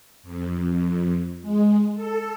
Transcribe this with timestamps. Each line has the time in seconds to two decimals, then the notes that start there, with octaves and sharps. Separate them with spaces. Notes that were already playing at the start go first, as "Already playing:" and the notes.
0.23 F2
1.42 G#3
1.95 A4